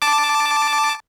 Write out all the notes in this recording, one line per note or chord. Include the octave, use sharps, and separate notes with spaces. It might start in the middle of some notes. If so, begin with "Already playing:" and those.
A5 D6